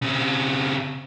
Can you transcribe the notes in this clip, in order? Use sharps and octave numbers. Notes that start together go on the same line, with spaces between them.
C#3 C4